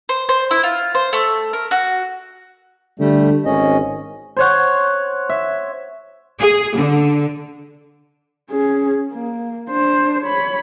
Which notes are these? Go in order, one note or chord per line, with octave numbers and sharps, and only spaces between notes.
C5
C5
E4
F4
C5
A3
A#4
F#4
D3 G3 A3
G#1 C#4 D#5
C5 C#5 F#5
E5
G#4
D3
C#4 G#4
A#3
D4 C5
C#5 B5